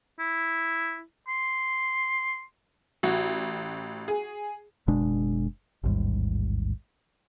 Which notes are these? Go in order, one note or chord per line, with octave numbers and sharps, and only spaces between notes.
E4
C6
A1 F#4
G#4
F#1 B2 G#3 D4
A1 D#2 G#2 G3